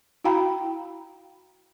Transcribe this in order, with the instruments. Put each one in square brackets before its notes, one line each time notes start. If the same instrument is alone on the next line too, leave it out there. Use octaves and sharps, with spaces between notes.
[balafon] E4 F#4 F5 G5 A#5 B5